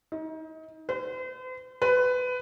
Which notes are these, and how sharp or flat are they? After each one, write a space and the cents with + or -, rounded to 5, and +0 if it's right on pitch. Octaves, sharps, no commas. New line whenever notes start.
D#4 +30
C5 -45
B4 +20